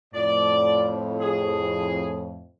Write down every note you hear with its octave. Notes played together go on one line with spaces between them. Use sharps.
F2 A2 D5
G#4